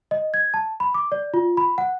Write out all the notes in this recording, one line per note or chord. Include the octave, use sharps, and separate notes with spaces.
D#5
G#6
A5
B5
D6
D5
F4
B5
F#5